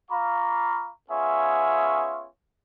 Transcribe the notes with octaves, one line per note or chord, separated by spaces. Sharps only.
F4 F5 A#5 B5 C#6 D6
B3 C#4 F4 G#4 C#5 E5